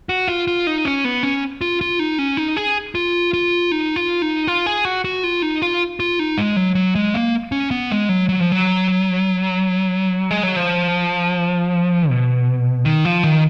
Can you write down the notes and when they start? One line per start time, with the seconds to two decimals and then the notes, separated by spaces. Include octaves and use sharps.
0.09 F#4
0.28 F4
0.47 F4
0.67 D#4
0.85 C#4
1.05 B3
1.23 C#4
1.61 F4
1.81 F4
1.99 D#4
2.19 C#4
2.37 D#4
2.56 G#4
2.95 F4
3.33 F4
3.72 D#4
3.96 F4
4.22 D#4
4.47 F4
4.66 G#4
4.85 F#4
5.05 F#4
5.24 F4
5.42 D#4
5.62 F4
6.00 F4
6.19 D#4
6.38 G#3
6.57 F#3
6.75 F#3
6.95 G#3
7.14 A#3
7.52 C#4
7.71 B3
7.90 G#3
8.09 F#3
8.29 F#3
8.40 F3
8.52 F#3
10.31 G#3
10.43 F#3
10.56 F3
12.10 B2
12.85 D#3
13.05 F3
13.24 D#3